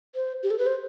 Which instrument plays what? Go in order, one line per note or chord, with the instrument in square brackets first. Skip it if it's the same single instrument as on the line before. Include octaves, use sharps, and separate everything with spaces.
[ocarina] C5
G4
A4
B4
C5